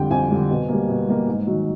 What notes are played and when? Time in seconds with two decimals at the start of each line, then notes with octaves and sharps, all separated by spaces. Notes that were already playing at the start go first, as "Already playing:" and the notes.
Already playing: F2 D3 G3 G5
0.10 F2 G#5
0.31 D3 G3
0.50 B2
0.69 G3 A#3
0.88 B2
1.09 G3 A#3
1.27 G#2
1.47 D#3 F#3